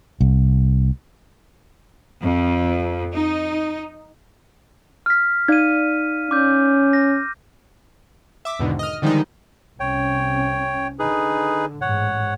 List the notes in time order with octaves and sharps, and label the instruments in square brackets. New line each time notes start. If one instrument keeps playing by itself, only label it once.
[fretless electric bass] C2
[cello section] F2
D#4
[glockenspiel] F6 B6
[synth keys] D#4 D5 F5 [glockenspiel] G#6 D#7
[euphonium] C#4 [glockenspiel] D6 G6
[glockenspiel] A#6
[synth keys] E5 D6
E2 G#2 B2 D3 D#3
D#5 F6
D3 D#3 F3 G3 G#3 D#4
[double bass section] C2 C3 C#4 [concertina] C#5 G5
[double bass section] D3 [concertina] D#4 G#4 B4
[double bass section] A1 G#2 [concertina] C#5 F#5